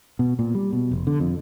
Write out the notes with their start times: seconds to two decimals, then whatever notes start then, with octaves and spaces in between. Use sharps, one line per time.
0.19 B2
0.39 A#2
0.55 G3
0.73 B2
0.91 F1
1.07 D3
1.20 F2